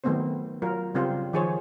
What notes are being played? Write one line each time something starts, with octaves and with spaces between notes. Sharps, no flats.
D#3 F#3 A3 B3 C4 C5
F#3 F4 A#4
C#3 G3 C4 F4 C5
D#3 F3 G#4 C5 C#5